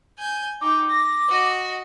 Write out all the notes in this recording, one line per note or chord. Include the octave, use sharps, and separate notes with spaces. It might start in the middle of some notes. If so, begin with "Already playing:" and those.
G#5 G6
D#4 G5 D6
A#6
F#4 D#5